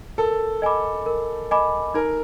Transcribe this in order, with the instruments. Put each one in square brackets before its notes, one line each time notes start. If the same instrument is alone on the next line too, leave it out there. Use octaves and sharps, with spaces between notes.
[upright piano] A4 [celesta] A#4
[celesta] D#5 G#5 B5 D6
A#4
D#5 G#5 B5 D6
[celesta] D#4 [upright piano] A#4